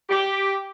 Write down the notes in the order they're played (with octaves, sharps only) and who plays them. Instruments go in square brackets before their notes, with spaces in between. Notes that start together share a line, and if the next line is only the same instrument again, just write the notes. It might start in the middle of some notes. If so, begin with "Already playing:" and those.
[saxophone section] G4